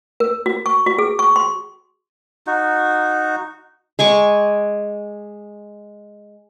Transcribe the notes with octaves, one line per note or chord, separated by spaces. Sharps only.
A#4
F#4
C#6
F#4
G#4
C#6
C6
D#4 F#4
G#3 G#5 C#6 D6